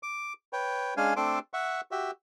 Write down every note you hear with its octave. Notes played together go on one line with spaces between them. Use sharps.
D6
B4 C#5 G5
G#3 C#4 D4 F5 G#5
A3 C4 D4 A4 C6 D6
E5 F#5 C#6
F#4 G4 E5